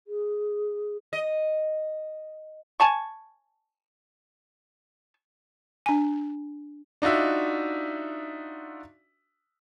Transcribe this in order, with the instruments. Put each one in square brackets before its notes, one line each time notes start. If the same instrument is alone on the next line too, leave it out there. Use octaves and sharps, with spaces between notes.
[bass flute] G#4
[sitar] D#5
[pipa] G#5 A5 C#6
[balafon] D4 G#5
[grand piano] D4 D#4 F4 F#4 E5